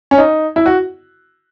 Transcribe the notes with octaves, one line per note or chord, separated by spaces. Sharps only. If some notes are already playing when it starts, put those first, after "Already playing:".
C#4
D#4
E4
F#4